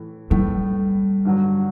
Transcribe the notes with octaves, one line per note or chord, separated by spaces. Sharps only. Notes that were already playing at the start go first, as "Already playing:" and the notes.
Already playing: A2 E3 A3
A2 E3 G3 A3
G2 D3 F#3